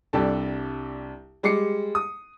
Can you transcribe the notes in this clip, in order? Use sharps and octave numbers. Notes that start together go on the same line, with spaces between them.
C2 D4 G4 A4 A5
G3 G#3 D6 C7 C#7
D#6